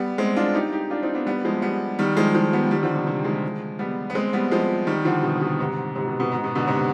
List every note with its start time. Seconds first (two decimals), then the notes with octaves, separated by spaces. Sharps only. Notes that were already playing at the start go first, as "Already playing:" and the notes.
Already playing: G3 B3
0.18 G#3 C4
0.36 D4 F4
0.54 D#4 G4
0.72 D#4 G4
0.90 D4 F4
1.02 C4 D#4
1.14 B3 D4
1.26 G3 B3
1.45 F3 G#3
1.62 G3 B3
1.99 D#3 G3
2.17 F3 G#3
2.34 F3 G#3
2.53 G3 B3
2.71 D#3 G3
2.83 D3 F3
2.95 C3 D#3
3.07 C3 D#3
3.24 F3 G#3
3.79 G3 B3
4.10 B3
4.15 G#3 C4
4.33 G3 B3
4.51 F3 G#3
4.87 D#3 G3
5.05 D3 F3
5.23 B2
5.36 C3
5.41 B2
5.60 G#2 C3
5.95 G#2 C3
6.08 B2
6.20 B2
6.32 G#2
6.44 B2
6.55 B2 D3
6.67 G#2 C3